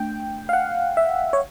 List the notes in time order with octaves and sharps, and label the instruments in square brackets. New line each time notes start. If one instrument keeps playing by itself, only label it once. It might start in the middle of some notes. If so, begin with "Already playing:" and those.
Already playing: [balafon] A3 D4 [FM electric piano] G5
[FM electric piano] F5
F#5
E5
C#5